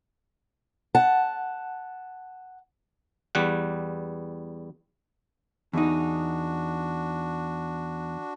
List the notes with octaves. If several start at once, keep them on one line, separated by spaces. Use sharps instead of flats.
F#5 A5
E2 G3 F#5
E2 D4 D#4 F#4